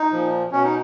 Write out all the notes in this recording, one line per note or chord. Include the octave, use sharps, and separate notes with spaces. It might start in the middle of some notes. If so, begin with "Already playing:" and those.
Already playing: D#4
A#2 F3
B2 C#4
D#4